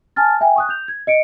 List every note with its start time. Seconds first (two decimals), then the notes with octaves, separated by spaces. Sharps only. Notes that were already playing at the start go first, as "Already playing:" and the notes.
0.16 G#5 A5 F6 A6
0.41 E5 G5 G#5
0.56 C#6 D#6 F#6
0.69 G6 F7
0.88 G#6
1.07 D#5 C#7 D7